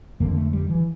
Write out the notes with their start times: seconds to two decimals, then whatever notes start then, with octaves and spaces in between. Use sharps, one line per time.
0.20 F2 D3 A#3
0.36 A3
0.53 G3
0.70 E3